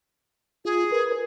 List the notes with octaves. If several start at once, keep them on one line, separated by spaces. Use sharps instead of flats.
F4 G#4
A#4 B4